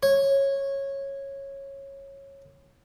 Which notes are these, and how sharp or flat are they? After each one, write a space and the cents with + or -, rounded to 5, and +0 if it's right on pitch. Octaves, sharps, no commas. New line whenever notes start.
C#5 -15